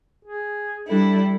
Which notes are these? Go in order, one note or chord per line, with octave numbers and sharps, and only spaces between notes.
G#4
G3 D4 E4 A4